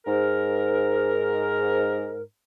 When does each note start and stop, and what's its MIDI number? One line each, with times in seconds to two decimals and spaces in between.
0.06 2.22 44
0.06 2.22 70